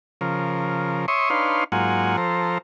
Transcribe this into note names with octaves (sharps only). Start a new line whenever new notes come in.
C#3 F3 A#4
C#5 E5 C6 C#6 D#6
D4 D#4 B4 C#5 F5 C6
G#2 F#3 A#3 F4 F#5 G#5
F3 A4 C5 A#5